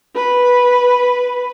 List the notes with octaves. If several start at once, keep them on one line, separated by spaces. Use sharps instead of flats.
B4